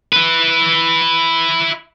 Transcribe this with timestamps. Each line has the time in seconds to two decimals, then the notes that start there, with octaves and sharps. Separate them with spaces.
0.13 E4 B4